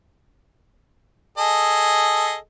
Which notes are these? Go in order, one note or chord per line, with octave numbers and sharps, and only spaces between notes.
G#4 A4 D#5